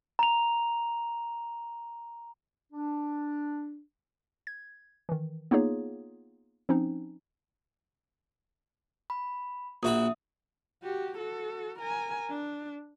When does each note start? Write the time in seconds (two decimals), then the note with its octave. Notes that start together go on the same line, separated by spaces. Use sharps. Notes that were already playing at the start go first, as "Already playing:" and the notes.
0.19 A#5 F7
2.73 D4
4.47 G#6
5.09 D#3 E3
5.51 A#3 B3 D#4 F4 G#4 C#5
6.69 F3 C4 C#4 D#4
9.10 B5
9.83 A#1 F#4 E5 B5 D#6
10.83 F#4 G4
11.18 F#4 A4
11.79 A#4 G#5
12.30 D4